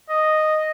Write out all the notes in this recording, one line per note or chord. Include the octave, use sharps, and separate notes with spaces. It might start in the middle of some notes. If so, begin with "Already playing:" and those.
D#5